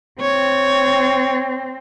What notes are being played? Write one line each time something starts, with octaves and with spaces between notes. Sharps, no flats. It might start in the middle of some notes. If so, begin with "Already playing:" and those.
C4 C#5